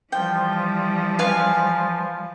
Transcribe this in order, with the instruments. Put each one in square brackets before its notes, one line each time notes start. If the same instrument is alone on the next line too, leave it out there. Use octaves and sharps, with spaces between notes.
[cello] E3 G3 [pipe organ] F3 [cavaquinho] G5
[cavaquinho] B4 F5 G#5